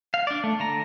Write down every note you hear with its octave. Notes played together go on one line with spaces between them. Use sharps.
F5
D4 D5
A3
D3 A#5